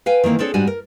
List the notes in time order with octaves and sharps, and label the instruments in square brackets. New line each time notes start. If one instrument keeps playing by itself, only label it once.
[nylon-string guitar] B4 F5 G5 G#5
D#3 E3 A#3 C4
C4 D4 G#4 A4 C5 C#5
G#2 G3 D4 F#4 G#5
A#4